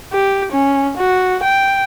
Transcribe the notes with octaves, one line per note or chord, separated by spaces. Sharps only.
G4
C#4
F#4
G5